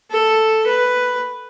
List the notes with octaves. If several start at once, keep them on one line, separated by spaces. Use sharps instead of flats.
A4
B4